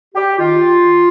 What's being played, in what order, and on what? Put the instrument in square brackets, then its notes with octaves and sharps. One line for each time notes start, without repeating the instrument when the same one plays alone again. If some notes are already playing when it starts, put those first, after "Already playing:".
[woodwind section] G4
D#3 F4